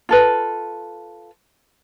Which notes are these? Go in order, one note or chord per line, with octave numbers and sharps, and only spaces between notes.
F4 A4 B4